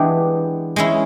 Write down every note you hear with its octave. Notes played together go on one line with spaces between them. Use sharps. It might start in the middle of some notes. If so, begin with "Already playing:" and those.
Already playing: E3 G#3 B3 D4 G4
G#3 C#4 E4